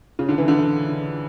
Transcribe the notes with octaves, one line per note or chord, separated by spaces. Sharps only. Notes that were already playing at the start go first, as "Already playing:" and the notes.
C#3
D3
E3
D3